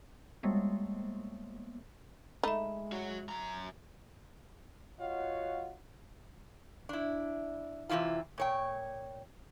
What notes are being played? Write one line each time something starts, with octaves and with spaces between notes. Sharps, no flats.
G3 G#3 A#3 B3
G#3 A3 D#4 E5 B5
F#4 C#5
F#2 A#5
F4 F#4 C#5 D#5 F5 F#5
D4 E4
C3 D#3 E3 E4 F4
A#2 C#5 G5